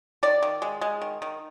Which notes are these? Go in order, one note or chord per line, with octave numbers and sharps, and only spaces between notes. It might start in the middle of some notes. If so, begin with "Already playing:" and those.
D#3 D5
D#3
G#3
G#3
D#3
D#3